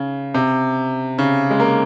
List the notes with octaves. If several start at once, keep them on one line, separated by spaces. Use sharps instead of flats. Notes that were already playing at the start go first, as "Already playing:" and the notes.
Already playing: C#3
C3
C#3
G#3
A#3